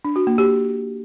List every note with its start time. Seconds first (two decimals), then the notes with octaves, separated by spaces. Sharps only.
0.05 D4
0.16 F#4
0.27 A#3
0.38 G4